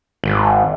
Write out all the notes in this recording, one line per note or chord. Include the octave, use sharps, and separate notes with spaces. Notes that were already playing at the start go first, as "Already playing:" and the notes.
G#1